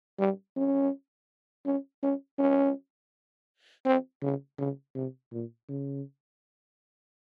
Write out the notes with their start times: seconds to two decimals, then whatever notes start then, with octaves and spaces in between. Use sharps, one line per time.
0.19 G3
0.56 C#4
1.66 C#4
2.03 C#4
2.39 C#4
3.85 C4
4.22 C#3
4.59 C#3
4.95 C3
5.32 A#2
5.69 C#3